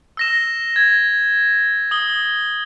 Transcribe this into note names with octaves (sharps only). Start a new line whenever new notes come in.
E6 A#6 E7
G#6
D#6 G7